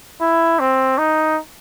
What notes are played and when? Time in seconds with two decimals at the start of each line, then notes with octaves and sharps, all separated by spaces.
0.21 E4
0.59 C4
0.98 D#4